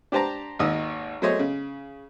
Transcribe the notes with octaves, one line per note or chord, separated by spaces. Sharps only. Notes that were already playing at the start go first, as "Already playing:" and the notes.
D4 G4 C5 A5 A#5
G#1 D#2 D#5 D#6 E6
F#3 G#3 A3 C5 C#5 D#5
C#3